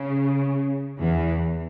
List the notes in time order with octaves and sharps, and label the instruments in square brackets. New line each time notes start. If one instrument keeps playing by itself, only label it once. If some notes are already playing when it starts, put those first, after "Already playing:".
Already playing: [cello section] C#3
E2 E3